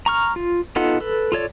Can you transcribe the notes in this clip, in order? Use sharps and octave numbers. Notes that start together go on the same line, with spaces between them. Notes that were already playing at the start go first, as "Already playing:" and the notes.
A#5 C#6 F6
F4
B3 D#4 F4 A4 F#5
A4 B4
F4 A4 C#5 D5